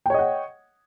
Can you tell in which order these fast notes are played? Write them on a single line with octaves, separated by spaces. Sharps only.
G5 C#5 D#5 F#5